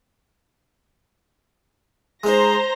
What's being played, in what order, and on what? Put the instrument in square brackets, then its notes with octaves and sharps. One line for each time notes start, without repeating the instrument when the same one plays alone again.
[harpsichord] G#3 D#4 [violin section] C5 A#5 A#6